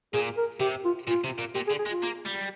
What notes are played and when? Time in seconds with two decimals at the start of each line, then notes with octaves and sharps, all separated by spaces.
0.14 A#2 G#4
0.37 A#4
0.60 C3 G4
0.85 F4
1.07 A#2 F4
1.24 C3
1.39 A#2
1.55 A#2 G4
1.67 G#4
1.70 D3
1.79 G#4
1.86 G#3
1.90 F4
2.03 A#3
2.25 G3